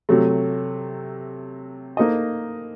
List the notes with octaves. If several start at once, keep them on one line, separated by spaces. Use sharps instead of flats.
C3 F#3 A3
A#3 D#4 A4 C5 D#5